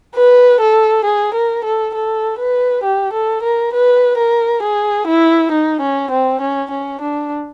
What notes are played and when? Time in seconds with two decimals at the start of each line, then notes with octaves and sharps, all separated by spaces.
0.15 B4
0.61 A4
1.05 G#4
1.34 A#4
1.65 A4
1.95 A4
2.39 B4
2.84 G4
3.13 A4
3.43 A#4
3.74 B4
4.18 A#4
4.63 G#4
5.07 E4
5.52 D#4
5.81 C#4
6.11 C4
6.41 C#4
6.71 C#4
7.01 D4